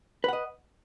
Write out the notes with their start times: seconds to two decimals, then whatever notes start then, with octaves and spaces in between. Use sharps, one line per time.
0.24 B4
0.28 F#5
0.33 D#5